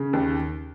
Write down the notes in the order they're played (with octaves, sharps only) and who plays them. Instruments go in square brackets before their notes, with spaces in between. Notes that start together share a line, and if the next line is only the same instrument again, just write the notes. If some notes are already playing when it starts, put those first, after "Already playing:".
Already playing: [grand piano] C#3
D#2